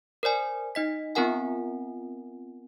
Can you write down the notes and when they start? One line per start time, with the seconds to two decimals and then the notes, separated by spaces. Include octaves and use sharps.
0.23 A#4 C5 D5 G#5
0.75 D#4 D#5 B6
1.15 B3 C4 F4 A#4 F#5 G#5